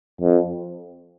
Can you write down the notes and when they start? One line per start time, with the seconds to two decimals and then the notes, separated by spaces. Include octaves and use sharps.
0.21 F2